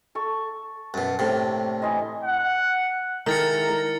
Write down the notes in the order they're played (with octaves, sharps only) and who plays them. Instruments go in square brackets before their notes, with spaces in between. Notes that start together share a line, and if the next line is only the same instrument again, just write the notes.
[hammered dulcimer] A4 C#6
[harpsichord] F#2 B2
[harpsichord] A2 C3 [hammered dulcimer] A#3 D4 A#5
[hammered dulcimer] E3 C5 D#5
[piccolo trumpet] F#5
[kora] D#3 [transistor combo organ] G#3 E4 A4 [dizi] A#5 [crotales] F6 A6 C#7